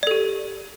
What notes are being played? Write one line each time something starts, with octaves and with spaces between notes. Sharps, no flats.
G4 A4 D5